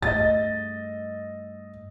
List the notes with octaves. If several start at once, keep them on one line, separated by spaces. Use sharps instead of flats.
G2 A3 D#5 A6